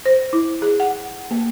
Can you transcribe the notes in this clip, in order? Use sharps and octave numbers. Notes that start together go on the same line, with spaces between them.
C5
E4
G#4
F#5
A#3